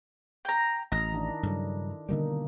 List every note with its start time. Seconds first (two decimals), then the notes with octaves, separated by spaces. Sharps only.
0.45 G5 A#5
0.92 A1 D#5 A#5
1.12 D#3 D4 E4
1.43 G2 C#3 F#3 A4
2.09 B2 D3 D#3 G3 A#3 D#4